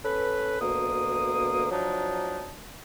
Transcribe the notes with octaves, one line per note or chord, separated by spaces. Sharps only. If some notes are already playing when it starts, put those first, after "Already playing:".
C#4 A4 B4
D2 B2 A#3 D#6
F3 F#3 D4 D#4